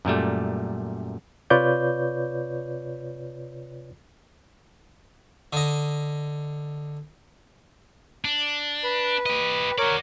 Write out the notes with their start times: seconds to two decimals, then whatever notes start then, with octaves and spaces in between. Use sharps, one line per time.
0.05 F#2 A#2 G3 A3
1.50 C3 F4 B4 C#5 D5 G6
5.53 D3 D#5
8.25 D4
8.84 B4
9.26 G4 D#5
9.78 F#4 A#4 C#5 D5